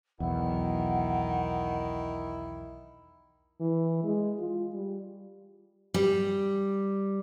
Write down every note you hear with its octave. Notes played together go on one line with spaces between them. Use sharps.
B1 E2 D#3 E4 F#5
E3
G#3
F4
G3
G3